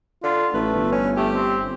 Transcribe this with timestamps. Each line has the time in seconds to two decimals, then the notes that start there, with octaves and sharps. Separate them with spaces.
0.23 D3 F4
0.54 A1 A3 B4
0.74 G1
0.92 C#4
1.16 A3 G4
1.33 C4